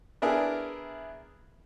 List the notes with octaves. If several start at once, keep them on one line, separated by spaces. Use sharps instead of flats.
B3 D4 E4 G#4 A#4